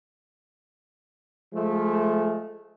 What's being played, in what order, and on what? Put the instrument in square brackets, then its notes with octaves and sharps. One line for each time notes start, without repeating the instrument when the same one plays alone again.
[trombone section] F3 G#3 A3